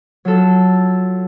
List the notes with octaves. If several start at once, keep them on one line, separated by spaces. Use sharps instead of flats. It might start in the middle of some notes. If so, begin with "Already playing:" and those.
F#3 F4 A4